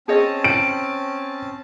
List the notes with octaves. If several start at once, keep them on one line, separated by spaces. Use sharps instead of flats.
C4 C#4 G#4 C#5 D#5 A5
D7